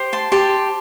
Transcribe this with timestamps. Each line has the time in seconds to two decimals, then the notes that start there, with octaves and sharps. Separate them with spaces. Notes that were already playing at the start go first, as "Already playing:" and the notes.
Already playing: G4 C5
0.13 A5 C6
0.32 G4 A5 C6